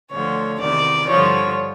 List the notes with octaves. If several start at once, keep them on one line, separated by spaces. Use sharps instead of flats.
D2 D3 F3 C#5
E2 C3 D#3 D5
G2 D3 F3 C#5